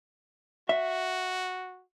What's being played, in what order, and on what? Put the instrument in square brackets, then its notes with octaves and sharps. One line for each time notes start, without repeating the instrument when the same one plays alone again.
[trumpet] F#4 [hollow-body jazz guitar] E5